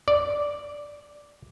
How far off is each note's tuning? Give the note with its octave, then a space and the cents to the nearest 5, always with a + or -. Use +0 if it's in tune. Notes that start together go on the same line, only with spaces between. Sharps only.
D5 -5